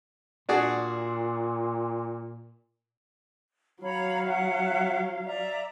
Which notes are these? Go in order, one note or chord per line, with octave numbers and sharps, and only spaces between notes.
A#2 D4 F#4 G#4
F#3 C#5 F5 A#5 B5
E5 F#5
D5 E5 A#5